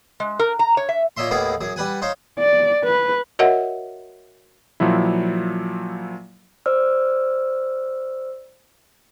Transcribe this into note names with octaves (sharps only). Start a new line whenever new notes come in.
G#3
A#4
A#5
C#5
E5
A#2 C#5 D#5 E5 C6
D#2 A2 B3 G#4 F5 D6
F#2 G#4
G3 B4 F#5 G#5
D#4 C5 C#5 F5
D5
B4
F#4 A#4 C#5 D#5 E5 F#5
A#2 F3 F#3 E4
C5 D5 E6 F6